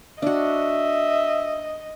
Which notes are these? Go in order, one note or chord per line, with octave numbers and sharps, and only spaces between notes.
D4 F#4 D#5 E5